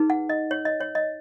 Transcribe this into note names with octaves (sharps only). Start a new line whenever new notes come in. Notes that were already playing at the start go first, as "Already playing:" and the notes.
Already playing: D#4 G#4 B4
F#5
D#5
C#5
D#5
C#5
D#5